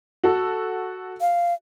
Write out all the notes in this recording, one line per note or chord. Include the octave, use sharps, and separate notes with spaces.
F#4 A4
F5